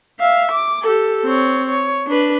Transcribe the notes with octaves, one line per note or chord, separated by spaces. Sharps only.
E5 F5
D6
G4 A4
C4 C#5
C#5
D4 B4